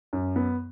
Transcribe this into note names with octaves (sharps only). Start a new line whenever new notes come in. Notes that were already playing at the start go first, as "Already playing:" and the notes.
F#2
B3